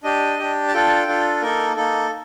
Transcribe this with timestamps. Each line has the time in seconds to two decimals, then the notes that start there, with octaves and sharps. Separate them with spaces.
0.04 D4 G4 D#5
0.39 D4 G4
0.68 A5
0.74 D4 F4 A4 G5
1.08 D4 F4 A4
1.42 A#3 D#4 A4 A#4
1.76 A#3 D#4 A4